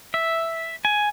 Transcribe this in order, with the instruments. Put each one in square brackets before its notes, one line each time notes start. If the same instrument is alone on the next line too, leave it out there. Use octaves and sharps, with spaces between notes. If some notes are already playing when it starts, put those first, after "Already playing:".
[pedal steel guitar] E5
G#5